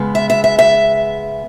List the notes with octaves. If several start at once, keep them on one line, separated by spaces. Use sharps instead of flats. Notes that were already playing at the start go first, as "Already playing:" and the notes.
Already playing: C#3 G#3 B3
E5
E5
E5
E5